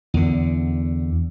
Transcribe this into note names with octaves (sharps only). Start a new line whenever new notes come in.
E2 D3